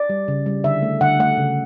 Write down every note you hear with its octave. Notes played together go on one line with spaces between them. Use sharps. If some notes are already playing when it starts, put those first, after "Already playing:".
Already playing: D5
G3
C#3
G3
D3 E5
A3
D3 F#5
A3 F#5
C#3